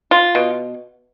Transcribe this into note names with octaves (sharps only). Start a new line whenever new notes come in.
F4
B2